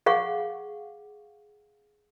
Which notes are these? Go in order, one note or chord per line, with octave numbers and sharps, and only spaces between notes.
G#4 F5 F#5 C#6